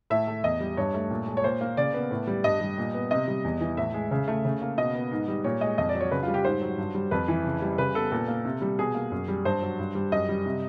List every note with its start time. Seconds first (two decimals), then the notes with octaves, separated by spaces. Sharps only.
0.10 A2 E5
0.27 A3
0.43 E2 D#5
0.60 G3
0.77 G2 C#5
0.94 A3
1.10 A#2
1.27 G#3
1.37 C#5
1.44 A#2 C5
1.61 A#3
1.77 C#3 D5
1.94 B3
2.11 A2
2.27 G3
2.44 G2 D#5
2.61 G3
2.78 A#2
2.94 B3
3.11 C3 D#5
3.28 G3
3.44 E2
3.61 E3
3.77 A2 E5
3.94 G#3
4.11 C#3
4.28 A3
4.45 C#3
4.61 A#3
4.78 B2 D#5
4.95 B3
5.12 G#2
5.28 G3
5.44 A#2 C#5
5.61 G#3 D#5
5.78 F2 D#5
5.89 D5
5.95 F#3
6.01 C#5
6.11 C#3 B4
6.23 F4
6.28 G3
6.34 G4
6.45 G#2 C5
6.61 F#3
6.78 G2
6.95 G3
7.11 F2 B4
7.28 E3
7.45 C#3
7.62 G3
7.78 C#3 B4
7.95 B3 A4
8.12 A#2 A4
8.28 A#3
8.45 C3
8.62 G3
8.79 B2 G#4
8.95 A#3
9.12 F#2
9.28 G3
9.45 G2 C5
9.62 F#3
9.79 G2
9.95 G3
10.12 F#2 D#5
10.29 G3
10.45 C3